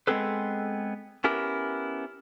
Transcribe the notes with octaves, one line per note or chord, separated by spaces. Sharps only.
G#3 B3 C4 G#4 A4 B4
B3 C#4 E4 G4 A#4